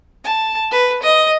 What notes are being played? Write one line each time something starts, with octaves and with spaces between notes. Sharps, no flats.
A5
B4
D#5